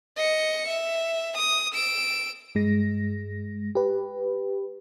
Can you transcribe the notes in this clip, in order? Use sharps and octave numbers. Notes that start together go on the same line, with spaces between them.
D#5 C#7
E5
D#6
E6 D7
G2 G#3 A#6
G4 B4